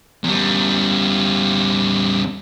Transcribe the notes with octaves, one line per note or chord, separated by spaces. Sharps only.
E2 G3